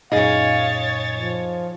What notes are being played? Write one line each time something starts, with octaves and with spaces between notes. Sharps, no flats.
F#2 A#2 D#4 G#4 C#5 F5 A6
F3